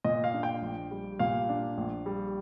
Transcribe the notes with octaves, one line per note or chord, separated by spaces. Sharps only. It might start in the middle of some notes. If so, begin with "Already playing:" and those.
A#2 D#5
F5
D4
G5
A#1
G3
A#2 F5
D4
A#1
G3